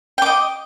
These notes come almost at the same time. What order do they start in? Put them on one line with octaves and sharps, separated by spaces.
G5 D6 D#5